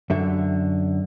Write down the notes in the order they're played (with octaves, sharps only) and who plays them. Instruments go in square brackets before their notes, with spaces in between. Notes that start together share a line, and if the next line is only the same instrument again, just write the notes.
[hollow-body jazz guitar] F#2 D3 E5